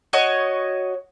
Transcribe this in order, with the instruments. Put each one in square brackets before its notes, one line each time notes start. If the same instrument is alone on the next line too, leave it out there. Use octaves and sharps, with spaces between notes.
[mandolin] F#4 C#5 D#5